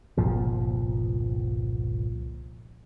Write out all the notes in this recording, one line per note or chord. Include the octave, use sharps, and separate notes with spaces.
G1 C2 A#2 F3